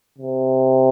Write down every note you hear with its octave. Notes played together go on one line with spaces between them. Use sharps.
C3